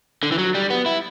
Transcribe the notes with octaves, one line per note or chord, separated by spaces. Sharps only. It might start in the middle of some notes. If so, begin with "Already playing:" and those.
D3
E3
F#3
G3
B3
E4